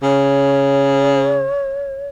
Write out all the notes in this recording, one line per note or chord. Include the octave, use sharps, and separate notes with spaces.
C#3 C#5